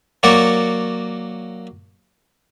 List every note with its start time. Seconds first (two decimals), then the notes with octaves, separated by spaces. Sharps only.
0.23 F#3 A#3 F#4 C#5 D5